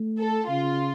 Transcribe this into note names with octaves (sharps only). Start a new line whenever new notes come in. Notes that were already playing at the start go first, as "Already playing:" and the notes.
Already playing: A3
A4
C#3 F4